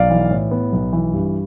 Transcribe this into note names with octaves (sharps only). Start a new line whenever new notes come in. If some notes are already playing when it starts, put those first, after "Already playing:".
Already playing: B1 D5 F5
E3
A2
B3
B1
E3
G2